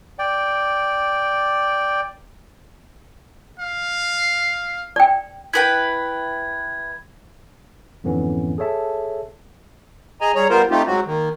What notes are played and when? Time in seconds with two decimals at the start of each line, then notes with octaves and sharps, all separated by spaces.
0.19 D5 G5
3.60 F5
4.96 D5 G5
5.54 E4 B4 G5 G#6
8.04 F2 G#2 D3 E3 B3 C#4
8.58 G#4 A4 C#5 E5 A5
10.21 G#4 D#5 G#5 A#5
10.35 G3 G#4 C#5 A#5
10.50 G3 B3 F4 A#4 C5
10.71 A3 C4 D#4 F4 G4
10.87 G#2 F#3 C4 F#4
11.07 D#3 A#3